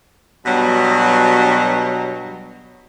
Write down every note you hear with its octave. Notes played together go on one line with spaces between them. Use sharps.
G2 B2 F#3